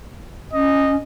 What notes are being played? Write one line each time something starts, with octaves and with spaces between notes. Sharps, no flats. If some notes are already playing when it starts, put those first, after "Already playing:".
C#4 D#5